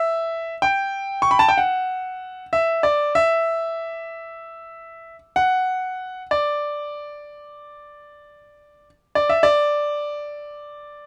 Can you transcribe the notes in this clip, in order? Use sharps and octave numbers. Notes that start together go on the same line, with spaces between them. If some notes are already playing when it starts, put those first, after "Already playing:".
Already playing: E5
G5
C#6
B5
A5
G5
F#5
E5
D5
E5
F#5
D5
D5
E5
D5